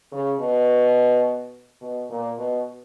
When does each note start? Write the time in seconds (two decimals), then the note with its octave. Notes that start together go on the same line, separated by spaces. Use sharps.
0.12 C#3
0.40 B2
1.81 B2
2.09 A#2
2.38 B2